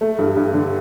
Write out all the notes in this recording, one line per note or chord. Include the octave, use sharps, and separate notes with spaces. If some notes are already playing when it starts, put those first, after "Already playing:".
A3
G2
G2
D3